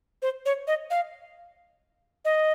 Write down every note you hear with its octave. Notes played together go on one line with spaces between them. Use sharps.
C5
C#5
D#5
F5
D#5